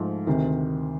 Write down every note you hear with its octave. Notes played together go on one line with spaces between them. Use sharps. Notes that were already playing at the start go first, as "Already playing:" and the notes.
Already playing: G#2 F3 A3
D2 C3 D#3